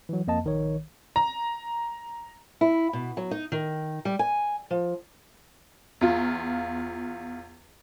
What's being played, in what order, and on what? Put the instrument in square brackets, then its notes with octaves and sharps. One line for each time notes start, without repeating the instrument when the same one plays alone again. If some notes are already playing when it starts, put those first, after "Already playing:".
[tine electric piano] E3 F#3
F2 A#3 D#5 A5
A#1 D#3 C#5
[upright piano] A#5
[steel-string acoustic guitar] E4
B2
F#3
D#4
D#3
G3
G#5
F3
[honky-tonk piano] E2 F4